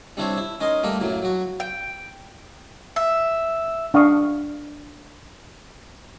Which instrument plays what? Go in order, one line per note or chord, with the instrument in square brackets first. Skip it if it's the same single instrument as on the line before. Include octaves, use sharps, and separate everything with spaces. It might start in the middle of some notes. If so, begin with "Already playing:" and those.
[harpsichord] G3 C4 D4 E4 C5 C#5
E4
C#4 D#4 A#4 D#5 C6
G3 A3 A#3 G4 A#4
F#2 A2 F#3 A#3
F#3 F#4
[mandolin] G5
E5
[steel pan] D4 F5 C#6 D#6